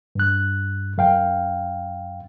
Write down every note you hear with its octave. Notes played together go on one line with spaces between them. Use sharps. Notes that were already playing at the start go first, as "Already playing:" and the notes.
G2 F#6
F#2 F5 G5